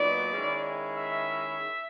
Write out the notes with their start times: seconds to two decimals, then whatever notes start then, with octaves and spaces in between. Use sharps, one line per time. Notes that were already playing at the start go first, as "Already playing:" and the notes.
Already playing: A#2 F#3 B3 D#4 D5
0.33 D#3 G#3 C#4 E4
0.97 E5